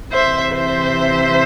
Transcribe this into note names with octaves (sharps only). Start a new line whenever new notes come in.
C3 E3 C5 E5
C5 E5